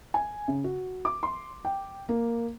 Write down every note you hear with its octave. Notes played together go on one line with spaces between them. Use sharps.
G#5
C#3
F#4
D6
C6
G5
A#3